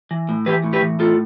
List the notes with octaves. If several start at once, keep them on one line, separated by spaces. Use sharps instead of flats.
E3
A2
E3 G4 B4
A2
G4 B4
E3
A2 F4 A4